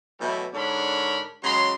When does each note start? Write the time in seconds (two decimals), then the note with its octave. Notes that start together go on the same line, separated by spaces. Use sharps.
0.20 B2 E3 F#3 G3 A3 E4
0.54 G#2 D3 D4 A#4 C#5 B5
1.43 C#3 F#3 G#3 A#5 C6